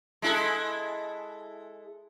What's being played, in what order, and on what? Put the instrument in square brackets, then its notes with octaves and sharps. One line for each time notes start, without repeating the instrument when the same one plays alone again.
[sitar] G#3 E4 A4